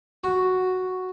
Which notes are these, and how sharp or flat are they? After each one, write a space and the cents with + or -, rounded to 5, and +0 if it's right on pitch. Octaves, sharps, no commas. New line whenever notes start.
F#4 +0